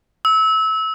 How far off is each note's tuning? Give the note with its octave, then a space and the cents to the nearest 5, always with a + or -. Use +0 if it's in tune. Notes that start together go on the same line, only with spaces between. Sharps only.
E6 -25